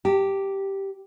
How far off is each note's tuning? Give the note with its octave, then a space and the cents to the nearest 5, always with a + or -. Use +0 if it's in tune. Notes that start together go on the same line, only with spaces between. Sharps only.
G4 -5 A5 +30